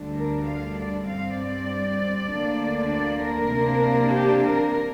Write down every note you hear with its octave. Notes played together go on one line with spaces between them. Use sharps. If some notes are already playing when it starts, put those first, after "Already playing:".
Already playing: D2 D3 G3 D4
A#4
F5
D5
G2 G3 C4 F5
D5
D2 D3 A#3 D4
D5
A#4
C3 A#3 D4
G4
A#4